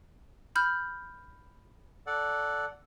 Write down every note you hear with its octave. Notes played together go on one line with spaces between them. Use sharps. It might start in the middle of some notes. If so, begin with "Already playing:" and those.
B5 F6 G6
A4 D5 F#5